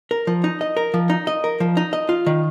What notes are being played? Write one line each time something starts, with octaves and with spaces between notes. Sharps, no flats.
A#4
F3
D#4
D#5
A#4
F3
D#4
D#5
A#4
F3
D#4
D#5
F4
D#3